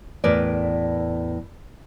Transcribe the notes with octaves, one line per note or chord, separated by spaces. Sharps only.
E2 A2 A#4 B4 D5